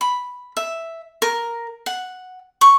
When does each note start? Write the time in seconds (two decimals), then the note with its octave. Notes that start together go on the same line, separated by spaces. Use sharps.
0.01 B5
0.57 E5
1.22 A#4
1.86 F#5
2.61 C#6